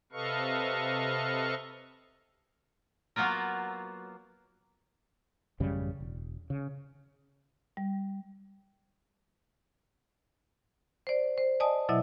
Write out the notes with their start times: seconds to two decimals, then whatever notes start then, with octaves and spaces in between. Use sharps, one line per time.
0.12 C3 A4 B4 D#5 F5 C#6
3.16 F#3 A#3 B3 F4 A#4
5.60 A1 F#2 C#3 G3
6.00 E1
6.50 C#3
7.77 G3
11.07 C5 D5
11.38 C5
11.60 D5 D#5 G#5 A5 D#6
11.89 B2 F#3 E4 D#5 E5